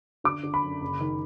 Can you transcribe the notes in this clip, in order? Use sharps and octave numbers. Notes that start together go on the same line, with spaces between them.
D3 D6
D3
B5
F#2
F#1
D#3